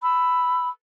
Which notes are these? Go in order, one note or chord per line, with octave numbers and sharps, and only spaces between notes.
B5 E6